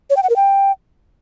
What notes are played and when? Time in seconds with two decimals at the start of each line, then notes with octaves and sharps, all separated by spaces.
0.10 C#5
0.17 G5
0.23 F#5
0.30 A#4
0.36 G5